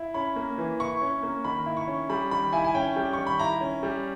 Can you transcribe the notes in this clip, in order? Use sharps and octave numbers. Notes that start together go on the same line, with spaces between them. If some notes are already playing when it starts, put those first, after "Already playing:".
Already playing: E4
C#4 B5
A#3
E3
E4 C#6
C#4
A#3
D#3 B5
E4
C#6
C#4
G3 B5
D#3 B5
E4 G#5
G#5
C#4 G5
G3
D#3 C#6
B5
E4 A#5
C#4
G3